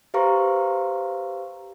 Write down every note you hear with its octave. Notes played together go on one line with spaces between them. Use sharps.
G4 B4 C5 F5 A#5 C#6